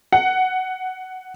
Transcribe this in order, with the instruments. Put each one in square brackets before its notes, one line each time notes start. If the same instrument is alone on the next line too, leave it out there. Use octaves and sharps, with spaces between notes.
[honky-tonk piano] F#5